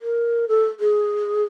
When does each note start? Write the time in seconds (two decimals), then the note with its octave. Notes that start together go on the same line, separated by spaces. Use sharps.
0.02 A#4
0.48 A4
0.80 G#4